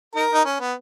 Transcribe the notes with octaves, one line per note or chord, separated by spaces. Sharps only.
D#4 A#4
D#4
C#4
B3